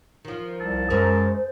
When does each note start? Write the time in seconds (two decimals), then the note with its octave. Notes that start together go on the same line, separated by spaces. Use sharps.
0.25 D#3 F3
0.61 C2 A5
0.90 F#2 G#3 A#4 C5 E5